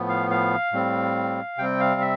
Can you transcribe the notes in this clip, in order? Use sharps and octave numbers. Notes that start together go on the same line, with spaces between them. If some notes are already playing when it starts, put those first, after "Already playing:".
Already playing: A2 F3 B3
F5
F5
A2 G3 C4
C3 G3 C4 G5
F5
E5